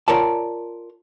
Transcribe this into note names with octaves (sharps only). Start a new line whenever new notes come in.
F4 A#4 C#5 D5 A5